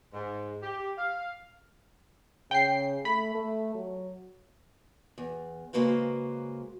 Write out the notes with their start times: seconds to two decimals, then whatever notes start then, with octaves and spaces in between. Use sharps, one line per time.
0.13 G#2
0.63 G4
0.98 F5
2.51 C#3 G5 C7
3.05 A3 B5
3.35 A3
3.75 F#3
5.18 E2
5.73 C#3 G#3 A#3 F#4 B4 C5